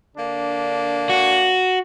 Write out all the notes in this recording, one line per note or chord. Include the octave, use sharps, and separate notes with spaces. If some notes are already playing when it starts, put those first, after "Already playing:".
D3 A#3 D4
F#4